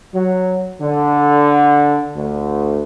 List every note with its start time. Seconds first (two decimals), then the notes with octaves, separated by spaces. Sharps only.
0.14 F#3
0.81 D3
2.16 D2